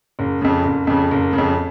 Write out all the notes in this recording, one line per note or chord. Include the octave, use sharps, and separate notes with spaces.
F#1
F2 C#3
F#1
F2 C#3
F#1
C#3
F2